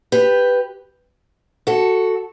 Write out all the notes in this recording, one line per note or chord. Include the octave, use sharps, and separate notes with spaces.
G4 B4
F#4 A4